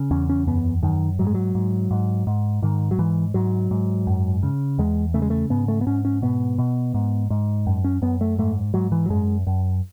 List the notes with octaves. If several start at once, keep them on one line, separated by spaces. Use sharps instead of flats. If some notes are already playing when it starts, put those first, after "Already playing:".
Already playing: C#3
E2 C#4
C#4
F#2 B3
F#2 D#3
G#2 F#3
G#3
F#3
G#2
G#2
G#2
G#2 D#3
F#3
G#2 E3
G#2 F#3
G#2
F#2
C#3
E2 G#3
C#3 A3
G#3
A3
G#2 B3
A3
B3
G#2 C#4
C#4
B2 B3
B2
G#2
G#2
F#2
C#4
F#2 B3
A3
G#2 A3
G#2 F#3
E3
F#3
F#2 G#3
F#2